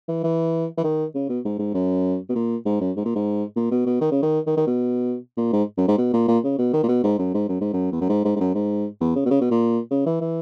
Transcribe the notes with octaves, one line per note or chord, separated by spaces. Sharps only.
E3
E3
E3
D#3
C#3
B2
G#2
G#2
F#2
B2
A#2
G#2
F#2
G#2
A#2
G#2
A#2
B2
B2
D#3
C#3
D#3
D#3
D#3
B2
A#2
G#2
F#2
G#2
B2
A#2
A#2
C#3
B2
D#3
A#2
B2
G#2
F#2
G#2
F#2
G#2
F#2
E2
F#2
G#2
G#2
G#2
F#2
G#2
E2
C#3
B2
C#3
B2
A#2
C#3
E3
E3